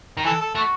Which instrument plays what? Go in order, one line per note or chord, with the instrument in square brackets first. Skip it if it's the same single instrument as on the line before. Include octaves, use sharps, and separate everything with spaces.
[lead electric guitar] D#3
[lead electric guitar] E3 [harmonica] A4
[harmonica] A4
[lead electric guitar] A3 [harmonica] F#4